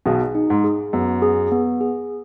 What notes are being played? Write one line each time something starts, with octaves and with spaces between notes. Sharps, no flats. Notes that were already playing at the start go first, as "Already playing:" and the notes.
B1 B2 G#4
D#4
G#2
G#4
F#2 B3
G#4
B3
G#4